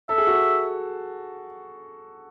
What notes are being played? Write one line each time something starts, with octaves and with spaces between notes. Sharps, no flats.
A4 E5
G#4
F#4
G#4